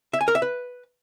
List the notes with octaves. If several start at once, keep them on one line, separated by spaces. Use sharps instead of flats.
E5
G#5
A#4
E5
B4